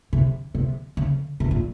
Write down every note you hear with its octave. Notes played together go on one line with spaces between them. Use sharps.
C3
C3
C#3
C3
A#2